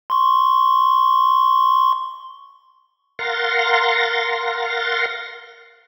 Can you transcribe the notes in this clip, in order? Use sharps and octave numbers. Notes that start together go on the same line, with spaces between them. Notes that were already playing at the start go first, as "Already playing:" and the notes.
C6 C#6
A#4 F5 F#5 C6 A6 A#6